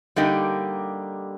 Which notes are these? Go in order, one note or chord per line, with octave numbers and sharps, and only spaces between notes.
D3 G3 A#3 D#4 G4